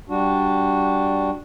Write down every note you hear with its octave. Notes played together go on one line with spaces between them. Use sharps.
G3 D4 F#4